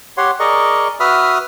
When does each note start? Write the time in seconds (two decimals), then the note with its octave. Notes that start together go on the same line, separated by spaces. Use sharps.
0.17 G4 C#5 F#5 C6
0.40 G#4 A#4 D5 D#5 C#6
1.00 F#4 B4 E5 B5 D#6 F6